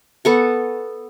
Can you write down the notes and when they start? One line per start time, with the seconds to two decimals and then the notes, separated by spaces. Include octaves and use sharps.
0.25 B3 A4 C#6